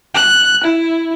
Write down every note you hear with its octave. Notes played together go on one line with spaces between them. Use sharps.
F#6
E4